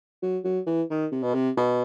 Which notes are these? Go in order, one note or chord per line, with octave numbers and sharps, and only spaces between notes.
F#3
F#3
E3
D#3
C3
B2
C3
B2